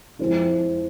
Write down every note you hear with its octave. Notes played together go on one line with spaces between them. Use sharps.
F2 G#3 C4 E4